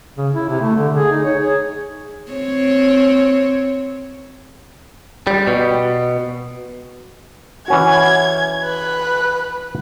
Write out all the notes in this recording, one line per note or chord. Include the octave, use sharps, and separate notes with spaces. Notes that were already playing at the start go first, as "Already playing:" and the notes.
C#3
E4
C3
A3
D3
G#4
D#4
C#5
G#4
C4 C#5
G3
B2
E3 C#4 F#4 G#6
B4